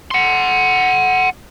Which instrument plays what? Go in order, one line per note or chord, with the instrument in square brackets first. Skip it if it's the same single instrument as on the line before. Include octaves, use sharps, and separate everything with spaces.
[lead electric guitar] F#5 C6